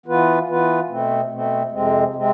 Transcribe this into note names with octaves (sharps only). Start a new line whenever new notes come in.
E3 B3 F4 B4
E3 B3 F4 B4
B2 A3 C4
B2 A3 C4
F2 C3 G#3 C4
C3 G#3 C4